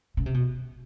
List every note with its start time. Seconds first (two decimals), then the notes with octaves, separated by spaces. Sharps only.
0.17 C#3
0.26 C3
0.34 B2